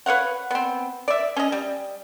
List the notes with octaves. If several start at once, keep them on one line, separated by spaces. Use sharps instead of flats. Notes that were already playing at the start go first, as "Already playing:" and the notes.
B4 C#5 F5 F#5
B3 C4
D5 E5
C#4 D#5
G3